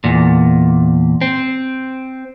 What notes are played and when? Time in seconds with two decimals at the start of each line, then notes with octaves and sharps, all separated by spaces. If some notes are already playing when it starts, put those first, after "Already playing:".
0.04 E2 A#2
1.21 C4